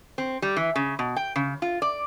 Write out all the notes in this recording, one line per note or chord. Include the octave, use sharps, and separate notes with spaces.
C4
G3
E3
C#3
B2
G5
C#3
F4
D5